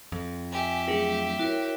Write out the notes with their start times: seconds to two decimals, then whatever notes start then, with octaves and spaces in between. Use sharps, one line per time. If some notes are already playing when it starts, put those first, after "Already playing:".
0.12 F2
0.53 G4 E5 G#5
0.88 F#3 A3 D4 G#4
1.39 E4 F#4 A#4 C#5